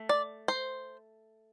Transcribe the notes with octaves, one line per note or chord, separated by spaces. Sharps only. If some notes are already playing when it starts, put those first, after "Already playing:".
Already playing: A3
D5
C5